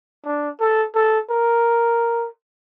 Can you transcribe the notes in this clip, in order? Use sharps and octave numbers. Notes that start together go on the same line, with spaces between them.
D4
A4
A4
A#4